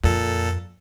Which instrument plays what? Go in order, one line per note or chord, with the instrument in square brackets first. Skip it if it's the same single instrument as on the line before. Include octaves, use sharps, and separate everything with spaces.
[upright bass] F2 [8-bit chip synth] A#2 A4